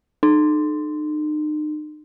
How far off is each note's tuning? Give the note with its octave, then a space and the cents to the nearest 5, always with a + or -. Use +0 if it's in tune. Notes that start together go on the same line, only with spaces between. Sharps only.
D#4 -40